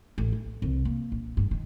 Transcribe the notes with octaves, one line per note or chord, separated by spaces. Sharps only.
A1
A3
C2
A#3
A#1
G2
D#3